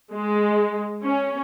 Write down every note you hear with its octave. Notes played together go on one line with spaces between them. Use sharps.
G#3
C#4